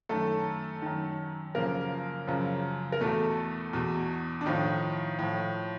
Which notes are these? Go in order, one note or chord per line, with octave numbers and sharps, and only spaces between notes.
F#2 D#3 A3 A4
F#2 D#3
F#2 C#3 F3 A#3 A#4
F#2 C#3 F3
A#4
E2 B2 A3 A4
E2 B2
D4
A2 D#3 F3 D#4
A2 F3